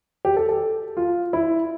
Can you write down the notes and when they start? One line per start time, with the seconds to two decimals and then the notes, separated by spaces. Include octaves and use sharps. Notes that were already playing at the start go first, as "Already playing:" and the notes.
0.25 G4
0.36 A4
0.49 A4
0.97 F4
1.33 E4